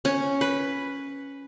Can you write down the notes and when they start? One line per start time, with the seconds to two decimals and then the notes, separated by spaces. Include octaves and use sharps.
0.05 C#4
0.41 B4